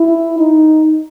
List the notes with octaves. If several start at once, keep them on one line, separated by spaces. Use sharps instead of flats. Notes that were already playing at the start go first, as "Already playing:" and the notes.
Already playing: E4
D#4